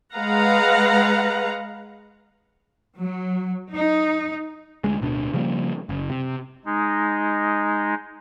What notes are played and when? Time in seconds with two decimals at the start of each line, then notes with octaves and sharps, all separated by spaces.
0.14 G#3 B4 F5 F#5 A#5
2.99 F#3
3.72 D#4
4.84 D2 G#3
5.01 D1 B2 D4
5.34 C#3 F3 G3 A#3
5.89 F#1
6.10 C3
6.66 G#3 D#4